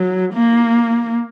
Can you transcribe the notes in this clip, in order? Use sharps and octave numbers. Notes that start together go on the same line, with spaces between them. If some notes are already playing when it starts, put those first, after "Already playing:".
Already playing: F#3
A#3